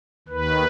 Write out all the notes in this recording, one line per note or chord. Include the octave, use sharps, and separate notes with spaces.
D#2 D#3 B4